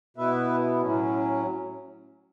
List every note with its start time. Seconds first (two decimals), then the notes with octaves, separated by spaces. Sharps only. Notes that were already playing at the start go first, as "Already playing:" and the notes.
0.17 B2 B3 E4 B4 E5
0.82 A2 F#3 C#4